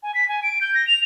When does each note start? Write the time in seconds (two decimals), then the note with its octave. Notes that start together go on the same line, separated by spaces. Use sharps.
0.03 G#5
0.14 B6
0.29 G#5
0.43 D7
0.61 G6
0.75 A#6
0.87 F7